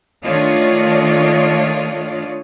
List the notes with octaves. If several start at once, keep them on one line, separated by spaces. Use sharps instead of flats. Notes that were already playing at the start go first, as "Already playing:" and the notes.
D#3 A3 D4 F4 C#5 D#5